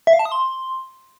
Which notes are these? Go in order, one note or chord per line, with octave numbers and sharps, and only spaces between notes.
E5
F5
A5
D#6
C6